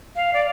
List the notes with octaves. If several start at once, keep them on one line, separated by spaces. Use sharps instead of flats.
F5
D5